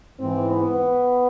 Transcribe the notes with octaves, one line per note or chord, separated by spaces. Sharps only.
G#2 E3 C4
B3